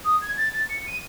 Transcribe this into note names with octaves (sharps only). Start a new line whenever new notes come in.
D#6
G#6
A6
A6
C#7
D#7